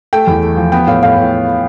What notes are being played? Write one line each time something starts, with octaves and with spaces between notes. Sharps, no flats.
A3 G5
E2
A3
F3
B3 G5
A2 F5
A2 F5
A2